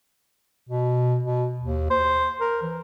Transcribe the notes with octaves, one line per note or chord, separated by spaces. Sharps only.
B2
B2
D#2
C5
A#4
E3